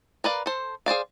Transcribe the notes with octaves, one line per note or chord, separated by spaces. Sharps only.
A#4 B4 D5 F5
A4 C5
G#4 C5 D5 F5